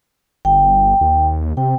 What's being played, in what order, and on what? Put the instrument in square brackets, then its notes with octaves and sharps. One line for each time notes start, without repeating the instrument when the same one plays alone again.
[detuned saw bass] G1 [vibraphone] G5
[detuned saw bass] D#2
[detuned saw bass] C3 [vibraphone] G5